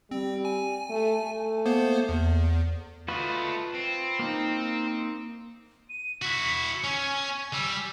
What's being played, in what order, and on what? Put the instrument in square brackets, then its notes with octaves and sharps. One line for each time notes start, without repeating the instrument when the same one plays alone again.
[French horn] G3 [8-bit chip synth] C4
[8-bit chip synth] G#5
[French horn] A3
A3
[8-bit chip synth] A#3 B3 C5
E2
[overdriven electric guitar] A3 F#4 [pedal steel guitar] F4 B4 D#5
[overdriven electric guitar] C4
[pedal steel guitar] A#3 D#4
[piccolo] D#7
[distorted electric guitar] E4 F#4 [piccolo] B6
[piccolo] C#7
[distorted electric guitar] C#4 [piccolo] G#5
[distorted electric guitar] G3 [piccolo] E6